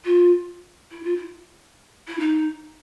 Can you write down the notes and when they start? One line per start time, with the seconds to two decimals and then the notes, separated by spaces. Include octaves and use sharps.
0.05 F4
0.91 E4
1.04 F4
1.16 E4
2.08 E4
2.19 D#4